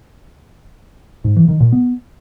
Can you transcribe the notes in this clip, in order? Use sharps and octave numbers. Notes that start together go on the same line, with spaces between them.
G#2
E3
D#3
A#2
B3